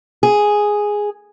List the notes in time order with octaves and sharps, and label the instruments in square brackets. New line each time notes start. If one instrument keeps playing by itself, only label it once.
[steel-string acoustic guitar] G#4